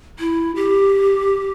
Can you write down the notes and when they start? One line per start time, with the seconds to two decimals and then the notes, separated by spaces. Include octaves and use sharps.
0.19 E4
0.56 G4